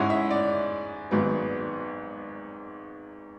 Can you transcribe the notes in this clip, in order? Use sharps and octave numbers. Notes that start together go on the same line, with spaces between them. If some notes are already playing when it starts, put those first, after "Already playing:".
Already playing: G#2 G#3 C#4 E4 F#5
E5
D5
G#1 G#2 F#3 B3